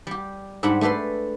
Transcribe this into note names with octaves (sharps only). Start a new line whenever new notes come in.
G3 G4
G#2 G3 D4 F#5 B5
A3 G4 A4 B4 C6